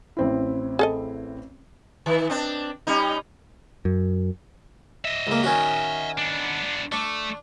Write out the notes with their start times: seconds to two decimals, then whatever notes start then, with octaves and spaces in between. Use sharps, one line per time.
0.17 A1 C4 E4
0.79 G#4 A4 D#5
2.06 D#3
2.30 C4 D4
2.87 G3 C#4 D#4
3.85 F#2
5.05 D#5 E5
5.27 C#2 A#3
5.43 D#3 C#4 F#4
6.18 B3 D4
6.92 A3 D4